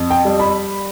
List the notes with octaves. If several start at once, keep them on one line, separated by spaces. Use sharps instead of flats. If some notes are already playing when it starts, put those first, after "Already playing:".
Already playing: F2
G5
G3
B5